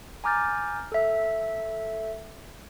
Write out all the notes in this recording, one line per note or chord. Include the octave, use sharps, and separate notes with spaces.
G#5 A#5 D6 F6 G6 A6
A4 E5